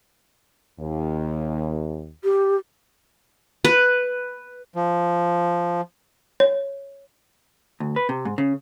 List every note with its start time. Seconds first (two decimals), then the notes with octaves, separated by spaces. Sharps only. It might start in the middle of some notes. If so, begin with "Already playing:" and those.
0.80 D#2
2.24 G4
3.65 B4
4.75 F3
6.40 C#5
7.80 D2
7.96 B4
8.09 C3
8.25 G#2
8.38 C#3